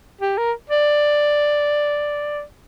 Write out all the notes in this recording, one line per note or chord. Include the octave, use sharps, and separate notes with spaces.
G4
A#4
D5